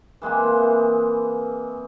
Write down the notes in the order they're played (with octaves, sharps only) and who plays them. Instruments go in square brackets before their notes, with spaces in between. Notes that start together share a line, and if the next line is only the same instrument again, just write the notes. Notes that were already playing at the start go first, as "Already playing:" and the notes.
[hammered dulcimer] E3 G#3 A#3 C4